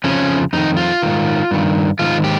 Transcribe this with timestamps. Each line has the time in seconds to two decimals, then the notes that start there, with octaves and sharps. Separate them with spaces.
0.04 F2 C#3 F3 C#4
0.53 F2 D#3 D#4
0.77 F4
1.02 G#2 D#3
1.51 G2 D#3
1.99 G#2 D#3 F4
2.24 G4